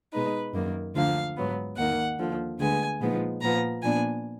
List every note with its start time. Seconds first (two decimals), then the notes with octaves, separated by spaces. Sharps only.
0.13 B2 G#3 D#4 B4
0.53 F#2 D#3 A#3
0.95 D2 D3 F3 A#3 F5
1.37 G#2 F#3 B3
1.77 D#2 D#3 A#3 D#4 F#5
2.18 D#2 D3 F3
2.59 D2 D3 G#3 B3 G#5
3.00 A#2 F3 G#3 B3 D#4
3.41 A#2 F3 B3 A#5
3.82 A#2 F3 B3 D4 G#5